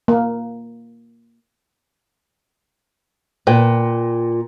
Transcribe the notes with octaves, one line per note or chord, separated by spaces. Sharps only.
A#3
A#2 B4 G5